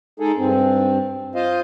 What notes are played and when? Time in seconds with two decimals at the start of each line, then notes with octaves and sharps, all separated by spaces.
0.20 G#3 D#4 G#4 A4
0.37 G2 C4
1.35 F4 C5 D#5 F5